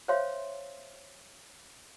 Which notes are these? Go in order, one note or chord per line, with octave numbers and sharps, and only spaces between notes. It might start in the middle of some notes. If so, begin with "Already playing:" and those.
C5 C#5 E5 F5 C6